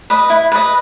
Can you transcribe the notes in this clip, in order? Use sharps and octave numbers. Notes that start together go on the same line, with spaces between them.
B4 D#5
E4
B4 D#5